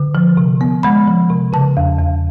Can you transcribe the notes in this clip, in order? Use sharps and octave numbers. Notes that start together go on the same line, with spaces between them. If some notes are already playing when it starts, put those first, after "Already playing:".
Already playing: D3
F3
C3
B3
G#3 B5
F3
C3
C#3 A5
E2
E2